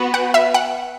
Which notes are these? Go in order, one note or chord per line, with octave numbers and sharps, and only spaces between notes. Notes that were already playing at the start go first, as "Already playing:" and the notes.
Already playing: B3 F#4 B4
F#5
E5
F#5